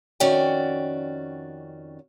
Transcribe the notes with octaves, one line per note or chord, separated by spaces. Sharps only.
F2 D#3 C#4 F#4 D5 G5